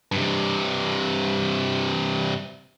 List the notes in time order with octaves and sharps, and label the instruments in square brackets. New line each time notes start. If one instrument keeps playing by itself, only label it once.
[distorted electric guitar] G2 C3